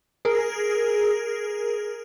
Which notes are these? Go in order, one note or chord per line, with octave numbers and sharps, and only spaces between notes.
G#4 A#4